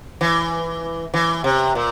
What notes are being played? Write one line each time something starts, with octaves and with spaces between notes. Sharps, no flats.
E3
E3
C3
A#2